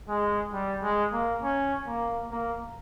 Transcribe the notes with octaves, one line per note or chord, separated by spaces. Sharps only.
G#3
G3
G#3
A#3
C#4
A#3
A#3